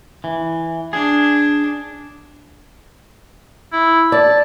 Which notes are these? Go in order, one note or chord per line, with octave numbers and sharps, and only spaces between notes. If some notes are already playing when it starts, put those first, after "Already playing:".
E3
D4 G#4
E4
D5 A5